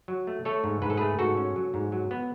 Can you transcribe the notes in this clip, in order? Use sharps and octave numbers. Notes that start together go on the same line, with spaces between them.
F#3
A3
A3 A4 C#5
G#2
G#2 B4
A4
A3 G#4 B4
G#2 F#4 A4
C#4
F#3
G#2
F#3
B3